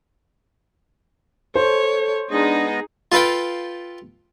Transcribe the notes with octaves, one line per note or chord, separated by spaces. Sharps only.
A4 C5 C#5
G#3 B3 D4 D#4 G#4 D#5
F4 A4 B4 F5 G5